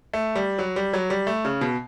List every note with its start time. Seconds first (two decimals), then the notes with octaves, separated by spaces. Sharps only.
0.13 A3
0.36 G3
0.59 F#3
0.76 G3
0.93 F#3
1.10 G3
1.27 A3
1.45 C#3
1.61 B2